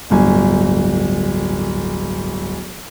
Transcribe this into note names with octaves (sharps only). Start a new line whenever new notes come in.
D1 G1 G#5